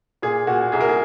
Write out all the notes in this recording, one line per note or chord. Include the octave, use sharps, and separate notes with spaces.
A#2 G#4
A#2 F#4
C2 G#4
A#4
G#4